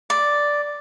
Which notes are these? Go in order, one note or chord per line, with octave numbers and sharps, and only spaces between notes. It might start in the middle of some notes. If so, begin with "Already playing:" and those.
D5